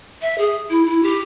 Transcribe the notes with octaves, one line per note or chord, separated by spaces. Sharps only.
E5
G#4
E4
E4
G4